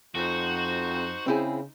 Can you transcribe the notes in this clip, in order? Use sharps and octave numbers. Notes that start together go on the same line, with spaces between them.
F2 D#4 F#4 C5
C#3 C4 E4 G#4